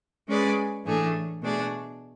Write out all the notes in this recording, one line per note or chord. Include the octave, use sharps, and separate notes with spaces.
G#3 C#4 G#4 B4 D5
A2 E3 A3 D4 G#4
B2 A3 D4 G#4 D5